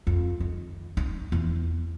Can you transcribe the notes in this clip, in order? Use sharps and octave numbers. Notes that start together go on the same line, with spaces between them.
F2
D#3
D#4
E2